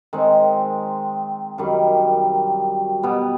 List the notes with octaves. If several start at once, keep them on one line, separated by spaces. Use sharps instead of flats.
D#3 G#3 C4
F#2 D#3 G3
B2 G3 B3